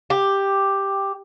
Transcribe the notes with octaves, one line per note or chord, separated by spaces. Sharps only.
G4